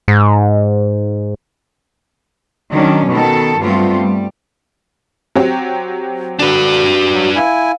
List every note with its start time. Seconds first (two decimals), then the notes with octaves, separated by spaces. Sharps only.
0.08 G#2
2.71 D#3 F#3 C#4 D4
3.08 B2 D#3 A4
3.59 G2 F#3 A3 B3 C4 F4
3.95 G3
5.35 F#3 C4 G4
6.39 D3 D4 F#4 B4
7.14 F#3
7.36 E4 F5 G#5